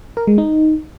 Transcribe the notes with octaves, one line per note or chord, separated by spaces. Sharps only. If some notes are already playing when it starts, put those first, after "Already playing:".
A#4
G#3
D#4